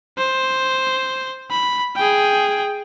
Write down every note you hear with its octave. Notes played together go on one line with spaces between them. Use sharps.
C5
B5
G#4 G5